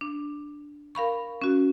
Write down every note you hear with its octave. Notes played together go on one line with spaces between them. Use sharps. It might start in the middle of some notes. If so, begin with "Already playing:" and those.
D4
A#4 F5 B5 C#6
C#4 F#4